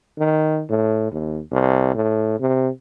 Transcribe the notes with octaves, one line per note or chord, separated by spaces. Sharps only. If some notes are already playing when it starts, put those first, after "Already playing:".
D#3
A2
D#2
C2
A2
C3